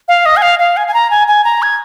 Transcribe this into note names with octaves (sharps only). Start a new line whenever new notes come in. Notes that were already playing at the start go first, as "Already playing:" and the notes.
F5
D#5
G#5
F5
F5
G#5
G#5
A#5
G#5
G#5
A#5
G#6